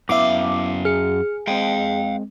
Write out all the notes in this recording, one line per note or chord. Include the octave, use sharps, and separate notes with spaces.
F#2 B3 E4 E5 F5 D6
G#4 F6 C#7
G#3 C4 F5 G5